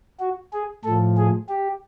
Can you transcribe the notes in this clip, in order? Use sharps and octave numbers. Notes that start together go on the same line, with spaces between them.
F#4
G#4
A2 F3 A4
G#4
G4